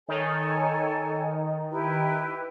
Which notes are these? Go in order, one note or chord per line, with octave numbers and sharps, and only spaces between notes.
D#3 D#4 A4 C#5 G#5
E4 G4 B4